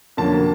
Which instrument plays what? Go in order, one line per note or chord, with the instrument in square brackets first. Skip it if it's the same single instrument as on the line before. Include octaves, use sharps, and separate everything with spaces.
[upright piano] F2 D3 F#3 A#3 C#4 A5